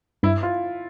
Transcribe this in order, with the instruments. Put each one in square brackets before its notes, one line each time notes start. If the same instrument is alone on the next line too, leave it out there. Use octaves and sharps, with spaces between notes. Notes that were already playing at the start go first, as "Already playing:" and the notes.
[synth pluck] G2 [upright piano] E4
[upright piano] F4